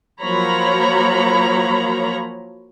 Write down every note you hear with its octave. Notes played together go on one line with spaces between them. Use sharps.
F3 F#3 A#3 C#5 A#5 B5